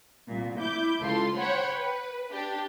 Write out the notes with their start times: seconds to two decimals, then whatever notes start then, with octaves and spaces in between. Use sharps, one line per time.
0.28 C2 A#2
0.60 E4 D6 G6
1.01 C#2 F4 A4 C6
1.37 C5 C#5 F#5 G5 B5
1.76 B4
2.32 D4 G4